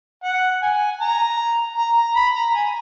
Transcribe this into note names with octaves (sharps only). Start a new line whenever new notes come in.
F#5
G#5
A#5
A#5
A#5
B5
A#5
G#5